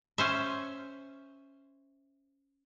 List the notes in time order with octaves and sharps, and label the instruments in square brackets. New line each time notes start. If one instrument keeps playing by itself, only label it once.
[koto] C#4 C5 E5